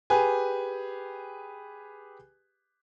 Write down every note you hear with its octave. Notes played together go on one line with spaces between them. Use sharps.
G4 G#4 B4 G#5